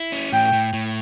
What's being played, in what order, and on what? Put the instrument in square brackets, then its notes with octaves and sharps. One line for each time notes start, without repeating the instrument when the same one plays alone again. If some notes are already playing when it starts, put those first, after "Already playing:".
Already playing: [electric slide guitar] E4
C#4
[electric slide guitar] A2 [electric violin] G5
[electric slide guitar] A2
A2